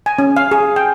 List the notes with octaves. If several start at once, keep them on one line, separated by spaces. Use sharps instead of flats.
G#5
C#4
F5
G#4
G5